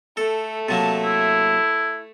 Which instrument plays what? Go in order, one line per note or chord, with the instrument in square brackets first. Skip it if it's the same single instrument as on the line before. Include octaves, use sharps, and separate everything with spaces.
[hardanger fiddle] A3 [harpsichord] A4
[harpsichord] C3 F#3 A#3 [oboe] A5
[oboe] E4